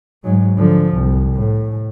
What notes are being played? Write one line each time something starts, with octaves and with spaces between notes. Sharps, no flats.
G#2 F#3
D3 F3
C2
A2